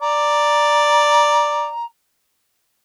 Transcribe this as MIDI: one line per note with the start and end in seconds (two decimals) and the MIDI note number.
0.01 1.70 74
0.01 1.85 82